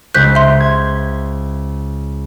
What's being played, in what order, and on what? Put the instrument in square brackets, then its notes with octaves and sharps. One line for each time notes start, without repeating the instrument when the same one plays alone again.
[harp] C#2 C5 [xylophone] F#6 G6 B6
[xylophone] E5 C6
[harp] G#6